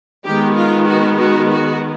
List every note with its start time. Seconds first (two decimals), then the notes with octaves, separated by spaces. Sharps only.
0.25 D#3 G#3 B3 G4
0.57 F4
0.88 F#4
1.19 F#4
1.51 F#4